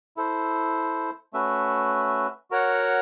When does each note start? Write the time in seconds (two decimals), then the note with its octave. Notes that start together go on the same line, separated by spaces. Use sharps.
0.17 E4 A4 C5
1.33 A3 C#4 F#4 B4 E5
2.51 F#4 A#4 C#5 F#5